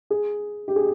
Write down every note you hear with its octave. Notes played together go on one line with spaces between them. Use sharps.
G#4
G4
G#4